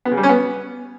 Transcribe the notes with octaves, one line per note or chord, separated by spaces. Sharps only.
B3
C#3
G3
C#4
B3